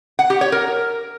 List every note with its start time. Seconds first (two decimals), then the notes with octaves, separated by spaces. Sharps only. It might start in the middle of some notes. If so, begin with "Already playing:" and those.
0.19 F#5
0.30 G4
0.41 C#5
0.52 A#4